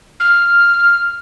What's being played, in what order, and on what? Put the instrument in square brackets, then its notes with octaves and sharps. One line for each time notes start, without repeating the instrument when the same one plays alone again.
[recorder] F6